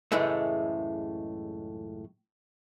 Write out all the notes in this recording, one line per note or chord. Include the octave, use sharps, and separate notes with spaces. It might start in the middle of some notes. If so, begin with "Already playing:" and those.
C#2 F#2 A2 E3 G#3 A3